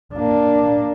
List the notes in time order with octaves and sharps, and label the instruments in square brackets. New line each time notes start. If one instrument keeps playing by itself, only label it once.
[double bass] A#3 D4